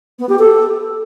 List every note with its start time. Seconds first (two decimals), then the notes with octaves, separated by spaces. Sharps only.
0.19 B3
0.29 G4
0.39 A4